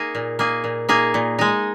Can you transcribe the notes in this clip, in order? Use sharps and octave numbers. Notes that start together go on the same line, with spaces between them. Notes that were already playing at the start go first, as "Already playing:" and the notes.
Already playing: A#3 D#4 G#4
A#2
A#3 D#4 G#4
A#2
A#3 D#4 G#4
A#2
G#3 D#4